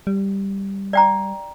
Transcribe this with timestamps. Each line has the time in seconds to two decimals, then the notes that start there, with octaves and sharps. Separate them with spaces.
0.07 G3
0.93 D5 G5 A#5